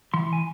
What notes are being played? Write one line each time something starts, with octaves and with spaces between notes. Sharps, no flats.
E3 C6
G#5